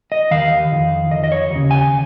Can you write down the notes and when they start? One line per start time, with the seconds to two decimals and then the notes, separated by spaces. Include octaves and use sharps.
0.12 D#5
0.31 D#2 D#3 F5
0.72 F2 D#3
1.11 F2 D#3 D#5
1.24 D#5
1.32 C#5
1.51 D#2 C#3
1.71 G#5